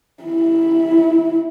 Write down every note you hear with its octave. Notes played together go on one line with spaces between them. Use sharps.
E4